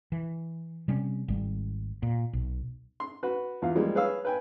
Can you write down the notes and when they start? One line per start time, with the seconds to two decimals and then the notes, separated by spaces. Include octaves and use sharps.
0.12 E3
0.88 C3 G3 C4 C#4
1.28 G#1 G3
2.03 A#2
2.33 B1
3.00 C6
3.23 F#4 B4
3.62 E2 F4 F5
3.75 F3 G3 G#3 A#3 F4
3.95 G#4 B4 C#5 F5 E6
4.25 B4 G5 G#5